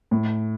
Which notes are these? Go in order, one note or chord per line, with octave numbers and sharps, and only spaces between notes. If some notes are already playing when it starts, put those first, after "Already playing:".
A2